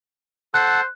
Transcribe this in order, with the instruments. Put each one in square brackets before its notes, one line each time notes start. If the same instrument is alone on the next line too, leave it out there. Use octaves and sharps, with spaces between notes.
[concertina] A4 F#5 A5 [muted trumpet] C5 [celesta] F#6